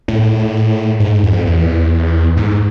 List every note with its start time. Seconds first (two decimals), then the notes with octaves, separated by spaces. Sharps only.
0.08 A2
1.00 G#2
1.23 F2
1.45 E2
2.37 G#2